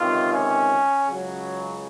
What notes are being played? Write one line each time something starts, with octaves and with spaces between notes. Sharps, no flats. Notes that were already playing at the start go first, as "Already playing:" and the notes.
Already playing: C#2 C3 D#3 F4
C#4
C#2 C#3 F#3